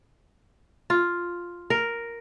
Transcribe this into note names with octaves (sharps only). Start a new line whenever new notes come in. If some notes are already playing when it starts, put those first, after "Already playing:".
F4
A#4